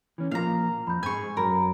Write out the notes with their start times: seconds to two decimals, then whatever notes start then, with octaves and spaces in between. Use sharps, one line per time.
0.18 E3 C#4
0.31 A#2 F3 A#3 F5 A#5
0.87 F2 B5 G6
1.03 G#2 G#4 G#5 C#6
1.37 F#2 F#3 A#4 B5